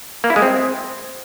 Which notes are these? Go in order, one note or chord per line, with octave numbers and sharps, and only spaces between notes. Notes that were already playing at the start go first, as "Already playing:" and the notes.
A#3
E4
G#3
C4